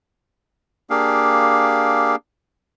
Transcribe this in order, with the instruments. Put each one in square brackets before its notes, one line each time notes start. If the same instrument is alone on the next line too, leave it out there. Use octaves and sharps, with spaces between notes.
[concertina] A#3 D4 G4 G#4 F5